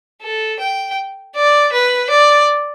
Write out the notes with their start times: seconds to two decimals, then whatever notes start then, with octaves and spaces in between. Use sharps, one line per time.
0.22 A4
0.60 G5
1.35 D5
1.72 B4
2.10 D5